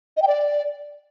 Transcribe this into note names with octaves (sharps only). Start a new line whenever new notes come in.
D#5
G5
D5